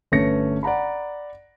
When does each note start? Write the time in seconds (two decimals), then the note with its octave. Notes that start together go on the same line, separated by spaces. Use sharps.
0.12 G1 A3 C#4 B4 A#6 C#7
0.63 D5 F#5 A#5 B5